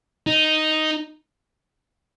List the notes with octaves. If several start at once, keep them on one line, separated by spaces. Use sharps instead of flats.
D#4